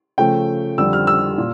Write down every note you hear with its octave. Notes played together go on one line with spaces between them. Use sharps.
C#3 F3 A3 G5
F2 D3 G3 E6
F6
E6
A#2